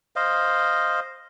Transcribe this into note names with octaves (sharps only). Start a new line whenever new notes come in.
C5 D#5 F5